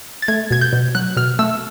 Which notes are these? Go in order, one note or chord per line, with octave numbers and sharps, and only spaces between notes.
A6
A3 G#6
B2 G#6
G6
B2
F#3 F#6
B2 F6
A3 E6